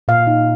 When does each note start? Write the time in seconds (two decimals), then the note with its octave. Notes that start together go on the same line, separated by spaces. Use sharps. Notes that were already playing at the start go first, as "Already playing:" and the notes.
0.08 A#2 F5
0.27 D#4